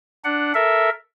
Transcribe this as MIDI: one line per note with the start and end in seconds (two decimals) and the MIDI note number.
0.24 0.53 62
0.24 0.53 78
0.54 0.90 69
0.54 0.90 70
0.54 0.90 76